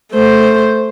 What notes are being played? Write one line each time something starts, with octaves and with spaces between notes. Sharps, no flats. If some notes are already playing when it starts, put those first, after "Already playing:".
A3 C5